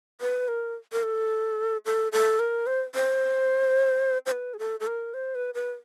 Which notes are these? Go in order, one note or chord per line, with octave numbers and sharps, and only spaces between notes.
B4
A#4
A#4
A4
A4
A4
A#4
C5
C5
C5
B4
G#4
A4
A4
A#4
C5
B4
B4